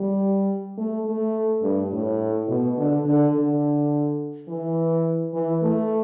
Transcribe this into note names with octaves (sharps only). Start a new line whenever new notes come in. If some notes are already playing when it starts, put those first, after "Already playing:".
Already playing: G3
A3
A3
G2
A2
B2
D3
D3
D3
E3
E3
A3